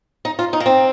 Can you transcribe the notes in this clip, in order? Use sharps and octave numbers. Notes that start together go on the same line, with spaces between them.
D#4
F4
D#4
A#3
C4